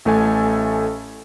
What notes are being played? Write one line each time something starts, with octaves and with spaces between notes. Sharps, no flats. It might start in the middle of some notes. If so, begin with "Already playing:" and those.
A1 A3 A4 G#5